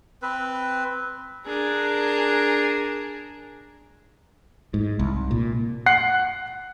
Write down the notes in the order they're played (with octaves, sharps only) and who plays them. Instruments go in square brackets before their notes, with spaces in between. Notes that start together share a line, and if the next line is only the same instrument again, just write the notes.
[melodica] C4 B4
[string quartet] D4 G#4 A#4
[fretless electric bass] G#2
C2
A#2
[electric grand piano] F#5 F#6 C7